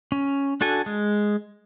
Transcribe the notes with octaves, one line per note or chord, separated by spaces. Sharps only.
C#4
D4 F#4 A4 G#5
G#3